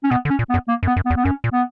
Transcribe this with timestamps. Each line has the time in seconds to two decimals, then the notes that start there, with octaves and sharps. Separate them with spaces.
0.04 C#4
0.11 B2 B3
0.25 D3
0.30 C#4
0.39 A#2
0.50 B3
0.54 F#2
0.68 A#3
0.83 F#2
0.87 B3
0.96 F#2
1.05 B3
1.10 E2
1.17 B3
1.24 F#2 C#4
1.44 A#2
1.53 B3